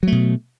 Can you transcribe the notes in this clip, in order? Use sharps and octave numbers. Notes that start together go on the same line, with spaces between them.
B2 F#3 A3